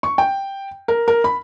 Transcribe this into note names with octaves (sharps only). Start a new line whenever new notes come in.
C#6
G5
A#4
A#4
B5